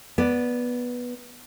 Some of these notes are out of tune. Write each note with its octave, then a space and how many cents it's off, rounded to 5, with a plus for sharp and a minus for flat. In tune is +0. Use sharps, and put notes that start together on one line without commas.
B3 -10 D5 +0